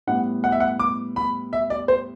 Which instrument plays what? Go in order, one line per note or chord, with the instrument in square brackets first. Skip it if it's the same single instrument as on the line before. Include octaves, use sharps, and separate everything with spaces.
[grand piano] A2 G3 B3 F#5
F#5
E5
F#5
D6
B5
E5
D5
C5